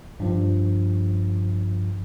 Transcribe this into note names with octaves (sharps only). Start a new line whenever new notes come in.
G2 F3